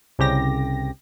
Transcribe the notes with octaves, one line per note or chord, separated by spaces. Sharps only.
C2 C#3 G4 A#6